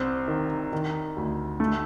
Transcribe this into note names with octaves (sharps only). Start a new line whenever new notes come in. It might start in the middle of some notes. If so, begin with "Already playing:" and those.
Already playing: C2 C4
D#3
D#3
D2
A3